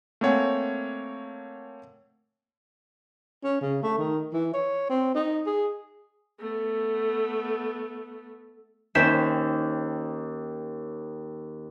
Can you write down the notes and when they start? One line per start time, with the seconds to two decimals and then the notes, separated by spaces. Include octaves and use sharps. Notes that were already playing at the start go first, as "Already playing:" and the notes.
0.21 A3 A#3 C4 C#5 F#5 G#5
3.44 C#4
3.61 C#3
3.83 A3
3.98 D#3
4.33 E3
4.53 C#5
4.90 C4
5.15 D#4
5.46 G#4
6.40 A3 B3
8.95 D#2 C#4 C5 G5 B6 E7